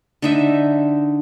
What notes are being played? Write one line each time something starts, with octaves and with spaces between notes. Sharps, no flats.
D3 D#4 E5